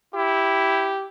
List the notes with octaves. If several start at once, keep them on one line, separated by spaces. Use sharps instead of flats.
E4 G4